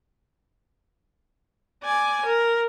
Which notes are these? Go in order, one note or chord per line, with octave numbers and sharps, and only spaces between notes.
D5 G#5
A#4